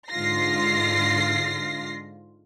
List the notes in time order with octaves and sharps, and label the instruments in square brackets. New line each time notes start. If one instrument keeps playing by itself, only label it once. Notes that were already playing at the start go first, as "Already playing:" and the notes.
[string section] G#2 D3 F4 A#6 C7